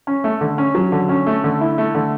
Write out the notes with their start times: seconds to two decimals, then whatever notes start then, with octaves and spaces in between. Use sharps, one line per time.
0.07 C#4
0.24 A3
0.41 D3
0.58 C#4
0.75 F#3
0.92 D3
1.09 C#4
1.27 A3
1.44 D3
1.60 E4
1.78 A3
1.95 D3